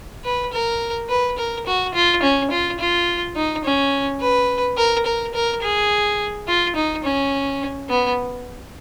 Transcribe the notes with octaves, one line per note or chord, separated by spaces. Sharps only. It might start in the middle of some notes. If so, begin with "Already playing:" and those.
B4
A#4
B4
A#4
F#4
F4
C#4
F4
F4
D#4
C#4
B4
A#4
A#4
A#4
G#4
F4
D#4
C#4
B3